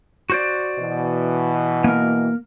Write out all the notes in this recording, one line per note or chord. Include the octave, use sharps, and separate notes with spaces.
F#4 C5 D5
B2 E3
A#3 A#4